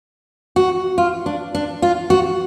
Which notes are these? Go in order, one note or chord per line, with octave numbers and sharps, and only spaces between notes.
F#4
F4
D4
D4
F4
F#4